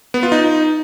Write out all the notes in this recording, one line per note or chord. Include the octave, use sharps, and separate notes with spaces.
B3
F4
D#4